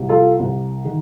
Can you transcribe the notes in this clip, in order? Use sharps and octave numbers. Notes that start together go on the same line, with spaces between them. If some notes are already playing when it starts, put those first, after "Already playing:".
Already playing: C2
F4 A4
C2
D#3